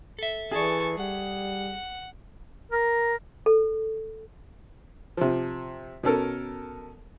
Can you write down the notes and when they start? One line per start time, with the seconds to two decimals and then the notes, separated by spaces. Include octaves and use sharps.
0.19 A4 E5
0.51 E3 G#4 D5 A5 C#6
0.98 G3 F#5
2.72 A#4
3.46 A4
5.17 C3 F3
6.03 B2 C#4 A4 A#4